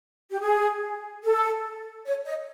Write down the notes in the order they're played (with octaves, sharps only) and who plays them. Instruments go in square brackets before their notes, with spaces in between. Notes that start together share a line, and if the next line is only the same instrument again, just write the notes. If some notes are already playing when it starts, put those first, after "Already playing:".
[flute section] G4
G#4
A4
C#5
D#5